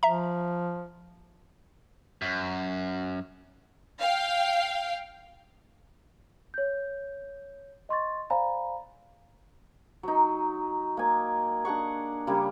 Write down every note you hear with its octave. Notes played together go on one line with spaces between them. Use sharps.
F3 E5 A#5
F#2
F5 G5
C#5 G6
D#5 C6 C#6 A6
C5 D5 F5 G#5 A#5 B5
F#3 D#4
A#3 G#5
D4 G#4 F#5 C#6
C#3 G3 A#3